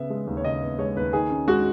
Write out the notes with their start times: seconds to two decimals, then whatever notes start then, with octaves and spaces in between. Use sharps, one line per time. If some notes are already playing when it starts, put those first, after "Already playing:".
Already playing: C#3 B3 E5
0.10 G#3
0.27 D#2
0.37 C#5
0.44 C#3 D#5
0.61 B3
0.78 G#3 C#5
0.96 D#2 B4
1.13 D#3 G#4
1.30 C#4
1.47 G#3 F#4